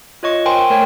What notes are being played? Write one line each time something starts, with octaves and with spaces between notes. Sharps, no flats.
F4 C#5 D#5 C#6
A#4 C5 G5 G#5 C6
A3 A#4 C#5 G5